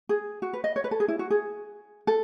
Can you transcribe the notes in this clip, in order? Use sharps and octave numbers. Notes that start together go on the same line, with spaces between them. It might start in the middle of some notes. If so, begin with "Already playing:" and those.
G#4
F#4
B4
D#5
C#5
B4
A4
G#4
E4
F#4
G#4
A4